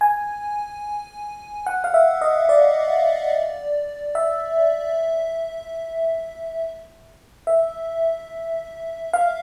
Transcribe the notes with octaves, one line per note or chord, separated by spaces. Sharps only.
G#5
F#5
F5
E5
D#5
D5
E5
E5
F5